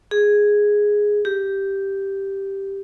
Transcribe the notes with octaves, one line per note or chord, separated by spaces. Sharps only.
G#4
G4